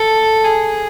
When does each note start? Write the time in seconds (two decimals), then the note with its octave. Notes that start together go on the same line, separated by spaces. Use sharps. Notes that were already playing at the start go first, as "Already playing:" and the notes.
Already playing: A4
0.44 G#4